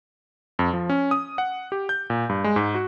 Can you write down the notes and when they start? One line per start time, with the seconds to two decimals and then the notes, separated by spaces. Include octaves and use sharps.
0.59 F2
0.73 F3
0.90 C#4
1.11 D#6
1.38 F#5
1.72 G4
1.89 G6
2.10 A#2
2.29 G2
2.44 G#3
2.56 G#2
2.75 F#4